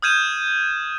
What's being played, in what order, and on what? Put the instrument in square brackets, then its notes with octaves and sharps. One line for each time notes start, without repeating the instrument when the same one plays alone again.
[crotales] D#6 F6 G6 G#6 D#7 E7